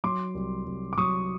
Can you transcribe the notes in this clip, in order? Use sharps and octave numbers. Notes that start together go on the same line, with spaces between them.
F#3 C6 D6
C2
C2
D6
F#3 C#6 D#6